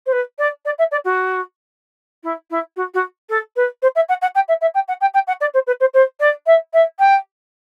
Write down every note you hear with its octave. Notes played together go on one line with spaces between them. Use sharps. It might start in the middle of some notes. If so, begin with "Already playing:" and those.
C5
B4
D5
D5
E5
D5
F#4
E4
E4
F#4
F#4
A4
B4
C5
E5
F#5
F#5
G5
E5
E5
G5
F#5
G5
G5
F#5
D5
C5
B4
C5
C5
D5
E5
E5
G5